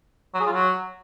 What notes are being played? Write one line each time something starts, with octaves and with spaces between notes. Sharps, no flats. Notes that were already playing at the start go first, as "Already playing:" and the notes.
F#3
G#4
F4
F#3